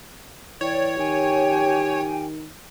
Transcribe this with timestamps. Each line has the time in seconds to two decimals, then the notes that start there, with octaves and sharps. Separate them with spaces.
0.61 E3 C#5 D5 G5
0.99 D#3 G4 G5 G#5